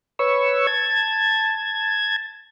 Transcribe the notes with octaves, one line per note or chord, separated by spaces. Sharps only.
B4 C#5 C#6 E6
A5 G#6